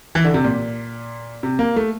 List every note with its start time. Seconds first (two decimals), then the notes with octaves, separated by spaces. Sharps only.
0.15 E3
0.24 D3
0.34 C3
0.44 A#2
1.43 C3
1.59 A#3
1.76 A3